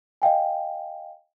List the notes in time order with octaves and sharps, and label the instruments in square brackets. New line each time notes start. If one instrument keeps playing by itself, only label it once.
[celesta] D#5 F5 G5 G#5